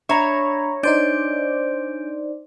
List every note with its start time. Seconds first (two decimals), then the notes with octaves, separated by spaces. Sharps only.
0.09 D4 C#5 E5 A#5 B5 C#6
0.83 D4 D#4 C5 D5 G6 D7